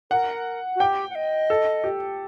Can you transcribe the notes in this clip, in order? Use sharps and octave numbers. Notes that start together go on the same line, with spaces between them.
A#4 F#5
F#4
G4 G5
F#5
D#5
A4
G4